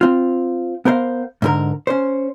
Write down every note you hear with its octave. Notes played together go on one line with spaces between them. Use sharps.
C4 F4
B3 A#4 C5 E5 F5
G#2 D3 A#4
C#4 C5